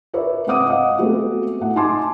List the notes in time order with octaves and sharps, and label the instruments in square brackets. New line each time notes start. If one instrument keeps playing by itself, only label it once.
[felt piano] A#4 B4 C#5 D5 E5
G#2 C4 F#5 D6 D#6
D#5 F5 F#5
G#3 A3 B3 C4 F#4
A2 F#5
D#4 G#5 A5 C6 D6